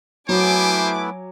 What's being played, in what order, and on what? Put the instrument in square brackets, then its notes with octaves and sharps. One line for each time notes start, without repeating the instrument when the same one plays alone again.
[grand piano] F#3 [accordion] A3 B3 E4 [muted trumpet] C5 [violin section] G#5 D6